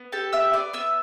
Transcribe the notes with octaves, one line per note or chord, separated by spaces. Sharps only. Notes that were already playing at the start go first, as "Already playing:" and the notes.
Already playing: B3
G4 A4 A5
B3 E5 E6
B3 D5 D6
B3 E5 E6